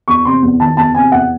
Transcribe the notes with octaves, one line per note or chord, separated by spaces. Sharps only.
E2 C#6
C3 C6
E2
D#3 A5
E2 A5
C3 G#5
E2 F#5